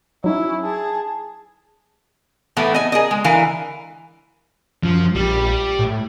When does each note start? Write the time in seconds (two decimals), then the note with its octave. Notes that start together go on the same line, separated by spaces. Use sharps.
0.24 F#3 C#4 D#4 E4
0.62 G#4 A5
2.57 A2 E3 A3 B3
2.74 D#5 G#5
2.92 G#4 A#4 D#5
3.11 G#3
3.24 D3 E3 A#4 F5
4.84 F#2 F3
5.15 A#1 G3
5.79 A2